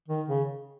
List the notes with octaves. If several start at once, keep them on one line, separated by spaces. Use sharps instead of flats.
D#3
C#3